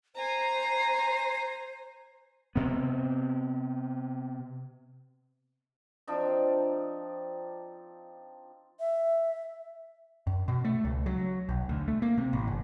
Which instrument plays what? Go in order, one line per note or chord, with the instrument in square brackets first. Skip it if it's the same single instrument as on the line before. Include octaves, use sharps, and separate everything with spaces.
[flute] C5 [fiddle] G#5 A#5
[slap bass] C3 B3
[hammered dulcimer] F3 C4 D4 D#4
[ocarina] E5
[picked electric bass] F#2
B2
A3
C#2
F#3
B1
D2
A3
A#3
C3
A1
G1